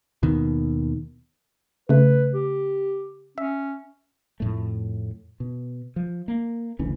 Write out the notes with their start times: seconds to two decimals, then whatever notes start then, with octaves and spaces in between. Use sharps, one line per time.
0.23 D#2 B2 D#3
1.89 C#3 A3 B4
2.34 G4
3.38 C#4 E5
4.40 F2 A2 A3
5.40 B2
5.96 F3
6.28 A#3
6.79 F#1 D2 E3 C#4